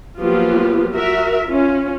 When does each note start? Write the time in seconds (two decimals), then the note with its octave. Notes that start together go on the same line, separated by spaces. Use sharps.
0.18 F3 F#3 A#3 B3 F4 G4
0.94 F#4 A#4 E5
1.46 C#4 F4